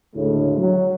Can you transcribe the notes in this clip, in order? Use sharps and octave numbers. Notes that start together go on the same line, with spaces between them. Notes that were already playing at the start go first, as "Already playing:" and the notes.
D2 A2 C#3 G#3 A3
F#3